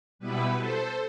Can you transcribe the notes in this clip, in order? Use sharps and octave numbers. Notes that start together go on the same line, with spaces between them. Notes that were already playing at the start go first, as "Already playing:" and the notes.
B2 G3 B3 E4 B4
A4 C5